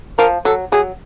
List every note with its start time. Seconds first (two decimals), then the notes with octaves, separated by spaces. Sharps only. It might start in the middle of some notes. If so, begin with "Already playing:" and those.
0.18 F3 A#4
0.45 F#3 A4
0.72 F#3 G#4